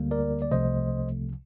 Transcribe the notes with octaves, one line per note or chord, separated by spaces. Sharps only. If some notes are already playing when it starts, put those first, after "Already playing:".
Already playing: D2 D3 G3 A#3
A#4 D5
D5
C2 C3 F3 A3 C5 D#5